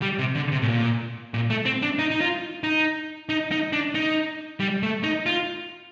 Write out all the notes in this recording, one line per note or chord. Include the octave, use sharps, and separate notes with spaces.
G3
C3
D3
C3
A2
A#2
A#2
A3
C4
D4
D#4
D#4
F4
D#4
D#4
D#4
D4
D#4
G3
A3
D#4
F4